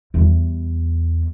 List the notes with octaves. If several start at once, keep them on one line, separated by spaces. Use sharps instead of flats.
E2 G3